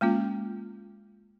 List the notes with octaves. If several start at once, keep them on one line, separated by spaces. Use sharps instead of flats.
G#3 A#3 C#4 F4